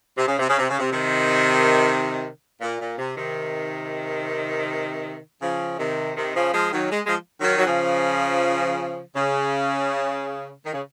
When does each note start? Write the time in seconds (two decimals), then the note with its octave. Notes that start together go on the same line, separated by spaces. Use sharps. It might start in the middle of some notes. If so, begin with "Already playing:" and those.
0.18 C3
0.28 C#3
0.39 C3
0.49 C#3
0.59 C3
0.70 C#3
0.80 C3
0.93 C3 D#3
2.61 A#2
2.80 A#2
2.99 C3
3.17 C3 D#3
5.41 C#3 F3
5.78 C3 D#3
6.17 C3 D#3
6.35 C#3 F3
6.54 F3 G#3
6.72 D#3 F#3
6.91 G#3
7.06 F3 G#3
7.41 D#3 F#3
7.58 F#3
7.66 C#3 F3
9.16 C#3
10.65 D#3
10.73 C#3